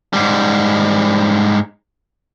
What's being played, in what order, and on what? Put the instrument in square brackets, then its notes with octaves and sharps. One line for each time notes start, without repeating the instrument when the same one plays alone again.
[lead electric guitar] G#2 G3